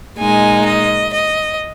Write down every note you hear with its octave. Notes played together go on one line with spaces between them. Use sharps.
A#2 G#3 D#4 G#5
D#5
D#5